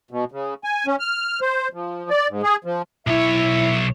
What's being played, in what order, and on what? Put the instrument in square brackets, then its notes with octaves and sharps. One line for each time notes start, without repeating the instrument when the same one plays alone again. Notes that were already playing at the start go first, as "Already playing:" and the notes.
[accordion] B2
C#3
G#5
C#4
F6
C5
F3
D5
G#2
G#4
F3
[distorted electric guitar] B1 C#5 [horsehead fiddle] E4 [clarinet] E5